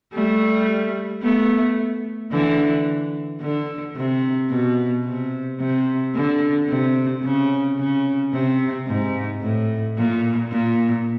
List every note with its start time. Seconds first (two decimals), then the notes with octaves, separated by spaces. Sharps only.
0.13 G3 A3
1.22 A3 B3
2.32 D3 E3
3.41 D3
3.96 C3
4.50 B2
5.05 C3
5.60 C3
6.15 D3
6.69 C3
7.24 C#3
7.78 C#3
8.33 C3
8.87 G#2
9.42 A2
9.97 A#2
10.52 A#2